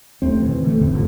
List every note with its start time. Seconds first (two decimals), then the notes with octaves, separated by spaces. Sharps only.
0.22 D#2 A3 C4
0.41 B2 E3
0.63 D3 A3
0.81 E2 A2 D3 C4
0.93 A1 G2 D3 F3